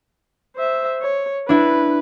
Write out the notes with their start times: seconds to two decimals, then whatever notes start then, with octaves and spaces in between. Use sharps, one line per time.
0.56 C5 E5
1.02 C#5
1.49 D4 E4 B4